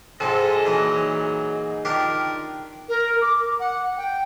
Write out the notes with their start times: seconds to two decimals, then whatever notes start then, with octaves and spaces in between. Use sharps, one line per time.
0.20 G#2 C3 G#4 A4 D#5
0.65 A#2 E3 F#3 D#4
1.03 G#4
1.85 D#3 D4 F4 G4 A#4
2.89 A#4
3.21 D6
3.60 F#5
3.97 G5